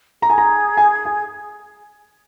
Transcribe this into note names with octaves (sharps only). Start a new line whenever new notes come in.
G#4 A#5
G#5
A#5
G#5
G#5